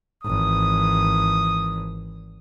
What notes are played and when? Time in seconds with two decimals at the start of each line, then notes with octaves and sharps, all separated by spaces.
0.24 G#1 E3 D#6